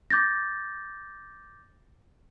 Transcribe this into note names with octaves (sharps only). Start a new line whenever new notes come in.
D6 G6 A6 A#6